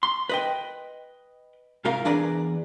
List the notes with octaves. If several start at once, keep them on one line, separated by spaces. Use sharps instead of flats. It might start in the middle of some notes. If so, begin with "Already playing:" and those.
C6
B4 D#5 G5
G#2 C3 F4 A#4 F5 A#5
E2 D4 G#4 B4 D5 A#5